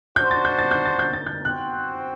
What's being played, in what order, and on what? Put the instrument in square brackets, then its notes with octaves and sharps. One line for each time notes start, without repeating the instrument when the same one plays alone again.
[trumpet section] D4 F#4 C5 [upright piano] G6
[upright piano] A6
G6
A6
G6
A6
G6
A6
G6
[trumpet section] C4 F#4 C5 G5 [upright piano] F#6